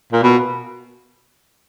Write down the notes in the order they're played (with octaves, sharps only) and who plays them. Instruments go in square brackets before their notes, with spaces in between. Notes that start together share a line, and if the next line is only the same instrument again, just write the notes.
[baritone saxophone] A#2
B2